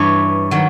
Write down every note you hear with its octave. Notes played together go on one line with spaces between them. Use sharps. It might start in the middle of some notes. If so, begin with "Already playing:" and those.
Already playing: G2 E3 C#5
D#3 F#3